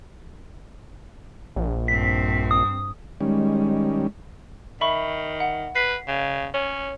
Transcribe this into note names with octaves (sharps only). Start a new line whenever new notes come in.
A#1
G2 C4 B6
D#6
D#3 G3 G#3 C#4
D#3 E5 B5 C#6
F#5
B4 B6 C7
C#3
C#4 C#5